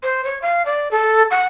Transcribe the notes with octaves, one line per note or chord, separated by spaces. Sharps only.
C5
C#5
F5
D5
A4
F#5